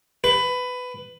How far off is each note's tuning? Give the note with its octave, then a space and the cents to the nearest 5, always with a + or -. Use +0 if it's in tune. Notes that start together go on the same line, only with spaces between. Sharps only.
B4 +15